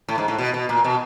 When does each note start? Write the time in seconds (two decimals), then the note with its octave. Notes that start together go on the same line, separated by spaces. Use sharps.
0.08 A2
0.18 G#2
0.28 A2
0.38 B2
0.54 B2
0.69 A#2
0.84 B2